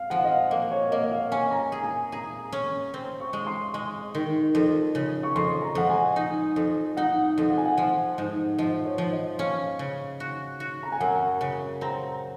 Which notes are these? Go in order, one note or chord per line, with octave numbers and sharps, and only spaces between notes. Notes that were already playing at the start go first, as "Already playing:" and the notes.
Already playing: F5
F3 F#5
D#5
F5
A#3
C#5
A#3 D#5
F5
C#4 G#5
A#5
G#5
G#4
G#5
G#4 A#5
C#4
C4
C#6
G#3
C6
G#3 C6
D#3
F2
C#3
C#6
F2 C6
A#5
F2 F#5
G#5
D#4
F2
D#4 F#5
F#5
F2
F#5
G#5
F#5
F3
G#2
F3 D#5
C#5
F3
D#5
C#4 F5
C#3
F#4
F#4
A#5
G#5
F#2 F#5
C#3
C4 A#5